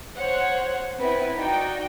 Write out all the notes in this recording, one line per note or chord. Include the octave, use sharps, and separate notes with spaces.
C5 C#5 F#5
B3 C4 E4 B4
D#4 F#4 D5 G5